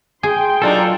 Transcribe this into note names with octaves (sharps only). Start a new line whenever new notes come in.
G#4 G5 C6
F#3 A#3 D4 D#4 F4 A4